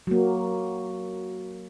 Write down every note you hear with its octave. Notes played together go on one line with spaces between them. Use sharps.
F#3 A#3